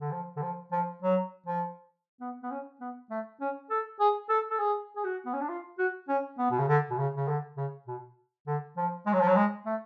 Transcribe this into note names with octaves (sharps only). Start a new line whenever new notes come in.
D3
F3
D3
F3
F3
F#3
F3
B3
B3
C#4
B3
A3
C#4
A4
G#4
A4
A4
G#4
G#4
F#4
B3
C#4
D4
F4
F#4
C#4
B3
B2
C#3
D3
B2
C#3
C#3
D3
C#3
B2
D3
F3
G#3
F#3
F3
F#3
G#3
A3